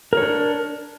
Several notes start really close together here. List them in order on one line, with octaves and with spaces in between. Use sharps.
A#4 C#5 D4